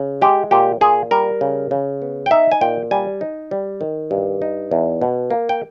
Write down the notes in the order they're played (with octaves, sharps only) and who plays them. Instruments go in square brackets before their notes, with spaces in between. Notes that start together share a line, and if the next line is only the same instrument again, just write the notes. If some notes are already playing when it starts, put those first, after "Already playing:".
Already playing: [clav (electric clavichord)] C#3
G#3 G4
A#2 G4
A#2 G#4
G3 A#4
C#3
C#3
B3
G5
D#4 E5
G#5
A#2 G5
G3 G#5
D#4
G3
D#3
G2
D#4
E2
B2
A#3
G5